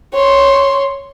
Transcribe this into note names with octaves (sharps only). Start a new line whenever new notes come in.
C#5 C6